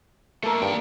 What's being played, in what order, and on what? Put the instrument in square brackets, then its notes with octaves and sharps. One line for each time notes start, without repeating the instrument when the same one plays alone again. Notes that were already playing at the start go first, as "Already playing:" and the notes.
[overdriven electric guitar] A3 A#3 [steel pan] A4 A#4
[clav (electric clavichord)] G2 [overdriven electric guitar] A#3 G5